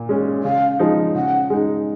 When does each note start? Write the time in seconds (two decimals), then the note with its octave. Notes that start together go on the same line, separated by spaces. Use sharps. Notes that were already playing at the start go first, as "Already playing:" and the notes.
Already playing: A#2
0.09 G#3 C#4
0.43 C#3 F5
0.79 F3 G#3 D#4
1.15 C#3 F#5
1.50 G#3 D#4